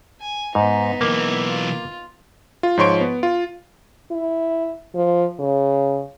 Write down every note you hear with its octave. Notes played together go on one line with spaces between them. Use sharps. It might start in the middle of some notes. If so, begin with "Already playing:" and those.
G#5
G#2 B3 D#4
B1 E3 A#3
F4
F4
G#2 F3 C#5 C6 C#6 D7
B3
F4
E4
F3
C#3